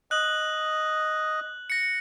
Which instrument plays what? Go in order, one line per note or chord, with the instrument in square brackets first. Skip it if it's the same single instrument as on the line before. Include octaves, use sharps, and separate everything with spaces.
[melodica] D#5 [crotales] F#6 F#7
[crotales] A#6 C#7